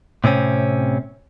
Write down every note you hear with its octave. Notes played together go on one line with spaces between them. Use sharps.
A2 C3 C4 C#4